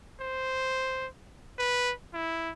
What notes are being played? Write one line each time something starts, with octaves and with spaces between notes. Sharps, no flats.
C5
B4
E4